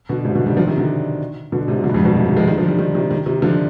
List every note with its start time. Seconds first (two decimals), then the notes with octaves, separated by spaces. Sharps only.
0.09 B2 D3
0.25 G#2 C3
0.35 B2 D3
0.46 D#3 G3
0.57 D3 F3
0.67 C3 D#3
0.78 B2 D3
1.52 B2 D3
1.68 G#2 C3
1.79 C3
1.84 B2 D3
1.90 G2
1.94 F2 G#2
2.05 G2 B2
2.15 G#2 C3
2.26 D#3 G3
2.37 F3 G#3
2.48 D#3 G3
2.58 D3 F3
2.68 D#3 G3
2.79 D#3 G3
2.95 C3 D#3
3.11 C3 D#3
3.26 C3 D#3
3.42 D3 F3